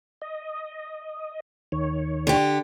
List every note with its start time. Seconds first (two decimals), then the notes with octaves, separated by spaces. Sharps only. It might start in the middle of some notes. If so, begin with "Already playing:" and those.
0.22 D#5
1.72 D#2 D#3 C#5
2.27 D3 G4